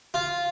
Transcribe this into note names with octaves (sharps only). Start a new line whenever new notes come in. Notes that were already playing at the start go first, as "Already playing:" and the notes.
F4